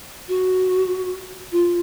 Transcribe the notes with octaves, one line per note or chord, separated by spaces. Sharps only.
F#4
F4